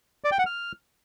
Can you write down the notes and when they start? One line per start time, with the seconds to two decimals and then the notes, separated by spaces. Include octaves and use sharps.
0.24 D5
0.32 G5
0.39 F#5
0.46 F6